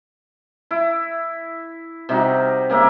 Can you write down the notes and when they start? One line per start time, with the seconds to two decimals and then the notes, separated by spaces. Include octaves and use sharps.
0.71 E4
2.09 C3 G3 D#4 F#4
2.70 C#3 A#3 G4 E5